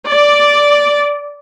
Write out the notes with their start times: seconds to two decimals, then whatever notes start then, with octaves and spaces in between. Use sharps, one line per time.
0.11 D5